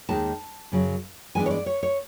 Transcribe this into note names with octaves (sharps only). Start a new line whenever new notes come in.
D#2 D#3 G#3 A5
F#2 C#3 F#3
G2 E3 G#3 B3 D4 G#5
C#5
D5
C#5
C#5